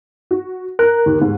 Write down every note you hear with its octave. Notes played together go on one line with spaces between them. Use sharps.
F#4
A#4 A#5 F#6
D#2
D#2 G#2